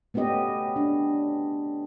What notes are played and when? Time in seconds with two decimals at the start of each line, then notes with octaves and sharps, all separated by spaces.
0.14 A3 B3 C#4 G4 D#5
0.76 D4